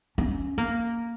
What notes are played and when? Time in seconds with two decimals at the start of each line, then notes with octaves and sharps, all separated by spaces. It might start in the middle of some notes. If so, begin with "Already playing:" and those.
0.18 C#4
0.58 A#3